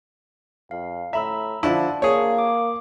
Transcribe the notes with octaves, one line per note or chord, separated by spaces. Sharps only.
F2 F5
A2 E5 A#5 B5 E6
D3 F3 E4 F4 D5 A5
A#3 G#4 C#5
D6